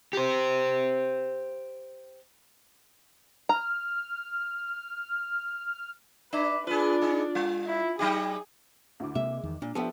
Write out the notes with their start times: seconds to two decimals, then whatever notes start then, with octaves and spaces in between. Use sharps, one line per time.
0.13 G4 C5
3.49 A#5 F6
6.33 D4 B4 E5 D6
6.67 D4 F4 G#4 B4
7.02 D#4 G#4
7.35 G3
7.66 E4
7.99 F#3 D#4 G4 G#4
9.00 D2 E4 D6
9.15 C3 G#3 A#3 E5
9.43 E2 D#3
9.62 A#2 D4
9.75 F3 B3 G4 A4 E5